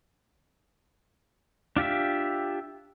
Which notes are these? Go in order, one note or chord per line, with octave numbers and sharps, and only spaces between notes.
D4 F4 G4 E5